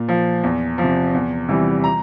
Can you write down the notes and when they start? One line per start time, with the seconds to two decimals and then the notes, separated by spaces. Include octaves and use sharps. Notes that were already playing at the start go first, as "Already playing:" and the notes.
Already playing: A#2
0.08 F3
0.43 E2
0.78 F3
0.83 C3
1.14 E2
1.48 C3 E3 G3
1.84 A#5